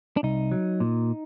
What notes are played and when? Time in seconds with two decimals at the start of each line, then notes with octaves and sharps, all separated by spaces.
0.17 D4
0.23 C2 D#4
0.52 F#3
0.80 A#2